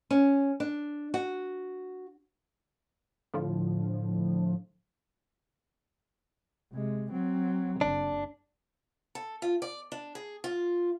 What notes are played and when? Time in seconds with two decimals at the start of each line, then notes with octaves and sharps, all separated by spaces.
0.11 C#4
0.60 D4
1.14 F#4
3.34 A2 D3 F3
6.73 C3 G#3
7.12 F#3 C4
7.81 F#1 D4
9.15 A4
9.42 F4
9.62 D5
9.92 D4
10.15 G#4
10.44 F4